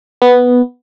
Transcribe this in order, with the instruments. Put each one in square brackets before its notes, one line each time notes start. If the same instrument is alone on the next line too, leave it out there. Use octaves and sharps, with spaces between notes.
[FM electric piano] B3